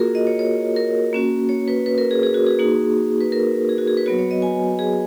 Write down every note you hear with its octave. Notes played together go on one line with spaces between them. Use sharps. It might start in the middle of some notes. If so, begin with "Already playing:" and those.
Already playing: A#3 F4 F#4 G#4 A#4
D#5
C#5
C#5
A#4
A#3 C#4 F#4
C#5
B4
B4
A#4
G#4
G#4
F#4
G#4
A#3 D#4 F#4
B4
A#4
G#4
F#4
G#4
B4
F#3 B3 F#4 C#5
C#5
D#5
G#5
G#4